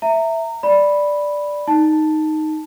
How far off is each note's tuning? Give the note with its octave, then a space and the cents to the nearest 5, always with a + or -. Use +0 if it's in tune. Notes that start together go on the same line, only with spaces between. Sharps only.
E5 +0 A#5 -25
D5 +0 B5 -5
D#4 +0 A5 +0